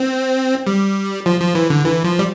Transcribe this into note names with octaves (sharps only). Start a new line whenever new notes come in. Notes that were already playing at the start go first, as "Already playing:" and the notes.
Already playing: C4
G3
F3
F3
E3
D3
E3
F3
G3